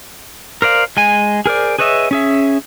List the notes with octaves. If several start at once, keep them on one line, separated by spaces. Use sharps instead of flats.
A#4 C5 D5 F5
G#3 G#5
G#4 A#4 C5 D5
G#4 B4 C#5 D#5 E5
C#4 G#4 E5